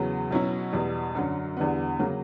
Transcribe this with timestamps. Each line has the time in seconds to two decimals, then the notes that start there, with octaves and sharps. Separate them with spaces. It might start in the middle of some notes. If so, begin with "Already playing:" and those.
Already playing: E2 C#3 F#3 B3
0.30 B2 F#3 C#4 E4
0.73 E2 B2 G3
1.15 F#2 D3 F#3
1.57 E2 D3 G3 B3
1.99 C#3 F#3 A#3